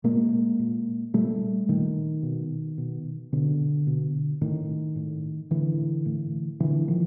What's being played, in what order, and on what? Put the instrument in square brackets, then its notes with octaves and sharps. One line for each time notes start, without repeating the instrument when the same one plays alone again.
[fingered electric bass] A#2 G#3 A#3
A#2
A#2 G3 A3
A#2 D#3
B2
B2
B2 D3
B2
A2 D#3
A2
A2 D3 E3
A2
A#2 D3 E3
D#3 F3